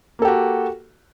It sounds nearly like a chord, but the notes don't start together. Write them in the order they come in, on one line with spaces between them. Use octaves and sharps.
A#3 A4 G4 F#4